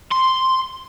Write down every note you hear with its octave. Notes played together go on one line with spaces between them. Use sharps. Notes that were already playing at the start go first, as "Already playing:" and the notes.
C6